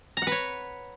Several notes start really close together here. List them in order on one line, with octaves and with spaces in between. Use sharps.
A#5 F#5 B4 C#5